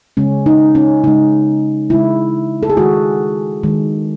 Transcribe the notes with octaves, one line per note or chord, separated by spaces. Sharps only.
C#3 G#3 C#4
D#4
C#4
C#3 G#3 D#4
C#3 G#3 E4
A4
G#4
D#3 G#3 F#4
D#3 G#3